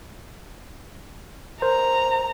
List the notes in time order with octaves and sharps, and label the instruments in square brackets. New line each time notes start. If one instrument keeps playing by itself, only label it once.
[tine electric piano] A#4 C5 [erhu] A#5